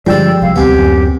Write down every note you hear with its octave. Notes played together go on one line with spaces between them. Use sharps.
G2 D3 F3 G#3 G4 D5 G5 E6
C2 F5
D2 C3 B3 G4 G#5
F#2